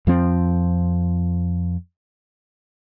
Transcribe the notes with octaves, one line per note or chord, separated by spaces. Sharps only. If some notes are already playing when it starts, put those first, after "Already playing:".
F2 F3 C4